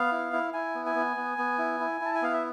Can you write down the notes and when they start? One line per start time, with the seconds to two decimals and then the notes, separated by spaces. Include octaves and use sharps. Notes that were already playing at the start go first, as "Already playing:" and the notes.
Already playing: B3 F5
0.12 E4
0.33 E4
0.53 E4 G#5
0.75 B3
0.86 G#5
0.95 B3
1.17 B3
1.38 B3
1.58 E4
1.80 E4
2.01 E4 A5
2.15 G#5
2.22 B3 F5
2.34 E5